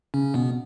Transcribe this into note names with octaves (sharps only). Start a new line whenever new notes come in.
C#3 C#4
B2 B3